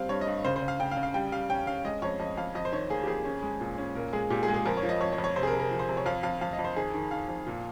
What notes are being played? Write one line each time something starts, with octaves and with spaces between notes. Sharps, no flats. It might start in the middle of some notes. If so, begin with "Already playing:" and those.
Already playing: G3 C4 F5
G2 C#5
D#5
G2
C#3 C5
C5
C#3
F5
C#3 G5
F5
C#3
F5
G3 G5
G3 F5
C#4 G5
C#4 F5
G#3 D#5
F2 C#5
F2 D#5
F2 F5
F2 D#5
C5
D#3 C#5
A#3 G#4
G4
F2 G#4
C#4
G#3
A#2
C#4
A#2 A#4
G#3 G#4
A#2 G4
G#4
G#3
G#4
F2 A#4
C#5
F3
D#5
F2 C#5
C#5
F2
C#5
C3 C5
G#4
A#4
C3
A#4
F3
C5
C3
C#5
F2 F5
F2 F5
F2 F5
D#5
F2
C5
D#3 G#4
D#3
D#3 F5
F2
A#2